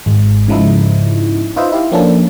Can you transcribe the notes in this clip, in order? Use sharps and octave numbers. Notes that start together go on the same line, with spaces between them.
G#1 G#3
G#2 C#3 F3 D#4 E4
D#4 F4 B4 C5 D#5 E5
E4 G4 F5
F3 A#3 C#4 D4 A4